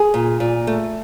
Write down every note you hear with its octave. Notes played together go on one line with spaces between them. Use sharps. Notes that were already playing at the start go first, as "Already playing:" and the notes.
Already playing: G#4
A#2
A#2
A3